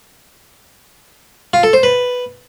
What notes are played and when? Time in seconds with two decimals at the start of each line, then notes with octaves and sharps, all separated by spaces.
1.54 F4
1.63 A4
1.73 C5
1.83 B4